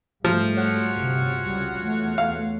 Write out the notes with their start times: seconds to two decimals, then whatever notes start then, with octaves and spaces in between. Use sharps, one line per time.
0.25 G#2 F3 G3 A3
0.57 F4 F#4 C#5
0.98 G1 C3
1.45 C#2 G3
1.80 E2 A3
2.18 F5